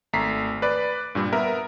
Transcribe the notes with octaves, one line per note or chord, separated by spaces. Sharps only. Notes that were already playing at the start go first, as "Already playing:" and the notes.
G#1 A3 A#5 B6 C7
B4 D5
G2 A#2 G3
B3 A#4 E5